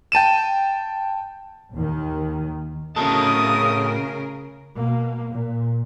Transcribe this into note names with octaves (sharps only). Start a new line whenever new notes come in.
G5 A5 D#7 E7
D#2 D#3
A2 C#3 A3 F#4 A#4 D#5 A5 D#6
B2 A#3
A#2